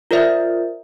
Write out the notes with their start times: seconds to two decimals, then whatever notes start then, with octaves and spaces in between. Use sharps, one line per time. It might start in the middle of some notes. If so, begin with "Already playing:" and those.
0.11 F4 A#4 C5 D5 E5